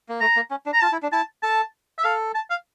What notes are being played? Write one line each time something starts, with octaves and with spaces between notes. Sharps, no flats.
A#3
A3 A#5
A#3
C#4
D4
A#5
F4 A5
E4
D4
E4 A5
A4 A5
E5
A4 F5
A5
F5